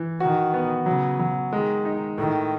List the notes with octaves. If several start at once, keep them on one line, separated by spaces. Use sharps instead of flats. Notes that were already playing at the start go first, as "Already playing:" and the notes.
Already playing: E3
D#3 F#4
B3
C#3 F#3
F#3
D#3 G#3
D#4
A2 D#3